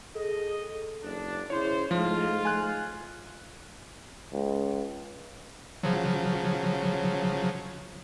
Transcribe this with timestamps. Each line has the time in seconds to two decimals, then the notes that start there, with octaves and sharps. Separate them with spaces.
0.15 G#4 A4 D#5
1.02 F#1 D4
1.50 C#3 E4 C5 C#5
1.91 G#2 F3 A3 F4
2.45 G#5 F#6
4.33 C#2
5.83 C#3 F3 F#3